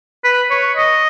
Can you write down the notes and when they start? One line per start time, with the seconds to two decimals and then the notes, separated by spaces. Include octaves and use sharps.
0.24 B4
0.51 C#5
0.77 D#5